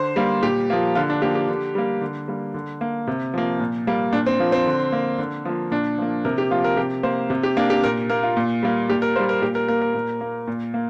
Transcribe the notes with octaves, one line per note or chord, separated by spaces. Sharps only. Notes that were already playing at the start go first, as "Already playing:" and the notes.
Already playing: D3 C5
G3 A#3
A#2 G4
F3 A#3
D3 F4
D4
F3 A#3 G4
G4
D3
G3 A#3
D3
G3 A#3
D3
A#3
C3
F3 A#3
A#2
G3 A#3
A#2 D4
C4
F3 A#3
C4
D3
A#3
D3
F3 A#3
A#2 D4
F3 A#3
C3 A#4
G4
F3 A#3 F4
A#4
C3 G4
A#3 C5
C3
G4
A#3 D4
G4
A#2 A#4
A#3 A#4
F4
A#2
G3 A#3
A#2 G4
A#4
G3 A#3 C5
A#4
A#2 G4
A#4
A#3 A#4
A#4
A#2
A#3
A#2
A#3